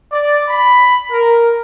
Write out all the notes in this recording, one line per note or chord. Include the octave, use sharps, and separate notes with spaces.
D5
B5
A#4